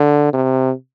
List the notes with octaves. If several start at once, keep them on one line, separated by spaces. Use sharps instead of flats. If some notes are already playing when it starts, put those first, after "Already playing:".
Already playing: D3
C3